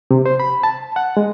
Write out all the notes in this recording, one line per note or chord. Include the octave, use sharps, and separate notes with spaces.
C3
C5
B5
A5
F#5
G#3